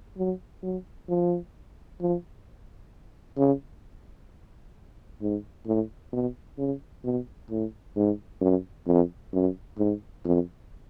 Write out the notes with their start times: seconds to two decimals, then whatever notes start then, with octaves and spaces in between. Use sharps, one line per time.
0.18 F#3
0.63 F#3
1.09 F3
2.01 F3
3.38 C#3
5.22 G#2
5.67 A2
6.13 B2
6.58 C#3
7.04 B2
7.50 A2
7.96 G#2
8.41 F#2
8.87 F2
9.33 F#2
9.78 G#2
10.25 F2